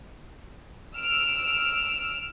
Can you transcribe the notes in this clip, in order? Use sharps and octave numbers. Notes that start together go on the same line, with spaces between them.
E6 F6 D7